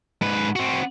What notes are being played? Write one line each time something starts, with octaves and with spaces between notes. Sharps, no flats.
G#2 B4
C4 F#4